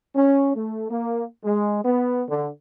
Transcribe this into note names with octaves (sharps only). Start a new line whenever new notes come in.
C#4
A3
A#3
G#3
B3
D3